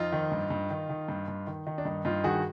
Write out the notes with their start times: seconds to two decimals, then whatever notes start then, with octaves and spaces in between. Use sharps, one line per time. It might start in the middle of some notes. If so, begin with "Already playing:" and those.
Already playing: F2 D#4 F4
0.12 D#3
0.32 G2
0.50 G2
0.70 D#3
0.89 D#3
1.09 G2
1.28 G2
1.47 D#3
1.67 D#3 D#4
1.78 D4
1.85 G2 D#4
2.05 G2 D#4 F4
2.24 D#3 F#4 G#4